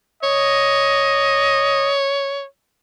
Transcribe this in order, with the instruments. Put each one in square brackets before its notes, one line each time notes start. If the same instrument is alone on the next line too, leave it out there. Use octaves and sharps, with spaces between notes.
[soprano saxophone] C#5 [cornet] D#5